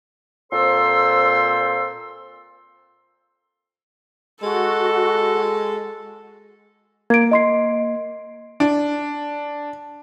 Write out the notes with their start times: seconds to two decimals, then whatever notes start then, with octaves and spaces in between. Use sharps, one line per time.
0.53 A#2 C4 A4 C5 C6 E6
4.43 G#3 F#4 A4
7.10 A#3 G#6 D7
7.31 D#5 C6 C7
8.60 D4